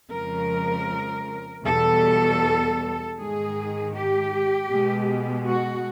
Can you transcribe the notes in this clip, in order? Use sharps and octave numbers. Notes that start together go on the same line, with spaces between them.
F2 C#3 F3 G#3 A#4
E2 B2 G3 A4
G#2 D#3 G#3 G#4
G4
B2 G#3
F#4